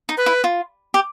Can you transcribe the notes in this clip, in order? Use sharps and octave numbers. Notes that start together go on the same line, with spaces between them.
D#4
B4
E4
F4
G4